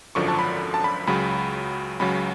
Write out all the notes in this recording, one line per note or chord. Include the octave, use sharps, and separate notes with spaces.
G#1 F#2 D3 F3 C#6
A5
B5
A5
B5
C#2 C#3 F#3 B5
C#2 C#3 F#3 B5